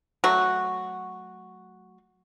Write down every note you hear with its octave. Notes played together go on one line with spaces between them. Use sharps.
F#3 A3 F#4